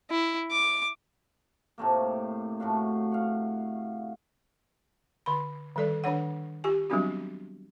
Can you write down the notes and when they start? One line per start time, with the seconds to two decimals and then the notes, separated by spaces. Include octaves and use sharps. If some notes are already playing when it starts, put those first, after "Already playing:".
0.10 E4
0.52 D6
1.78 A2 C3 A3 A#3
2.60 A2 A3 F#4 F5
3.12 F5 F#5
5.26 D3 B5
5.76 D#3 G3 A4 D5
6.04 D#3 D4 C#5 F#5
6.64 F4 G4 G#5
6.90 F#3 G3 B3 C4 D4 F#4